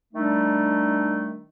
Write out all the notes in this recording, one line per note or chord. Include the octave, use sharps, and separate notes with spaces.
D#3 G3 A3 D4 D#4